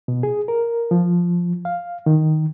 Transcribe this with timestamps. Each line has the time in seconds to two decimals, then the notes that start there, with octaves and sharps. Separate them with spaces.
0.08 B2
0.23 G#4
0.48 A#4
0.91 F3
1.65 F5
2.06 D#3